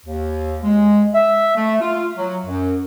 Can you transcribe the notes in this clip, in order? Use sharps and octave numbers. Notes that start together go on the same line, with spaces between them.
D#2
G#3
E5
A3
F4
F#3
F#2